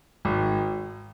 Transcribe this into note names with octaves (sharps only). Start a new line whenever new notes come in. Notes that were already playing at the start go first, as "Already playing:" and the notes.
G#1